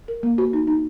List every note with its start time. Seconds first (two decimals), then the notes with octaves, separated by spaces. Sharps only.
0.08 A#4
0.23 A#3
0.38 F#4
0.53 D#4
0.67 D#4